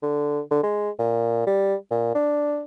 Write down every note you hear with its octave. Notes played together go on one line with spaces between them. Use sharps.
D3
D3
G#3
A#2
G3
A#2
D4